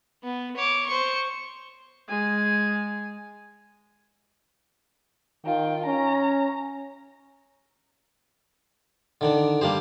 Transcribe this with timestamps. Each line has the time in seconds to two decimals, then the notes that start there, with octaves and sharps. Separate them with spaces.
0.23 B3
0.56 C#5 D6
0.86 C5 C#6
2.09 G#3 G#5
5.46 D#3 F4 G5
5.86 C#4 A#5
9.21 D3 D#3 D4
9.61 G3 A#3 D4 G4 C5